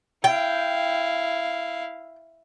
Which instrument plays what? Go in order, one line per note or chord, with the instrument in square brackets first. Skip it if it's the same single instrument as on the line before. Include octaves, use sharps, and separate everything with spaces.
[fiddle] E4 F5 [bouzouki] G5